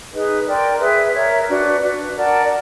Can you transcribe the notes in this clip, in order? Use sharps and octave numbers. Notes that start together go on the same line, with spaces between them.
D#4 G#4 B4 D#5
A#4 D5 G5 C6
G#4 B4 E5
A#4 C#5 E5
D4 F#4 B4
D4 F#4 B4
A#4 D5 F#5 A5